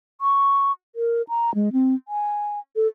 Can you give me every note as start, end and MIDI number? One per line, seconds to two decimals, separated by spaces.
0.21 0.72 85
0.95 1.22 70
1.28 1.53 82
1.55 1.69 56
1.73 1.95 60
2.08 2.59 80
2.76 2.87 69